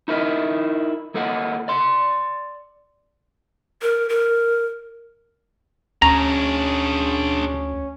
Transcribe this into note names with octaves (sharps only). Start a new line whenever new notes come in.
D#4 E4 A#4 D#5 E5
D#2 A#3 A4 D#5 F#5
D5 C6
A#4
A#4
D2 C#4 D4 G#4 A#5